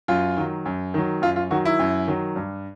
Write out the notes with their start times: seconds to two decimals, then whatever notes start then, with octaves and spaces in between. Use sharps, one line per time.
0.08 F#2 F4
0.37 D#3 F#3
0.66 F#2
0.94 D#3 F#3
1.22 F#2 F4
1.36 F4
1.51 D#3 F#3 F#4
1.65 E4
1.79 F#2
2.08 D#3 F#3
2.36 G2